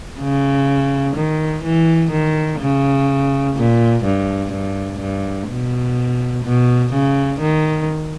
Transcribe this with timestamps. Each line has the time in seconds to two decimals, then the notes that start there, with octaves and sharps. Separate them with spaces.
0.20 C#3
1.16 D#3
1.64 E3
2.11 D#3
2.60 C#3
3.56 A#2
4.04 G2
4.52 G2
5.00 G2
5.49 B2
6.45 B2
6.93 C#3
7.41 D#3